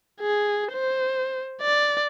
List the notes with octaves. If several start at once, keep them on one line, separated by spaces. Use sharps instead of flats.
G#4
C5
D5